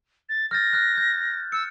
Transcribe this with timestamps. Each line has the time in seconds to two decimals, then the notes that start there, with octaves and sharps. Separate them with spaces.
0.29 A6
0.51 F6 G6 A6 A#6
0.73 F6 F#6
0.97 G6
1.52 E6 C#7